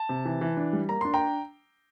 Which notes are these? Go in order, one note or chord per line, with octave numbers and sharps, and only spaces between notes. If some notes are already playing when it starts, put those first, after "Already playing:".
Already playing: A5
C3
E3
E3
D4
G3
A#3 A#5
D4 C6
G5 A#5